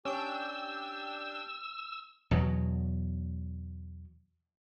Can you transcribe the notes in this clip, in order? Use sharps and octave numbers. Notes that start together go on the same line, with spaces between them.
C#4 D4 G4 G5 E6 G6
E2 B2 F#3